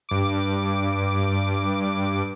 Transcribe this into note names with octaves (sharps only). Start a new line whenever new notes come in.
G2 D6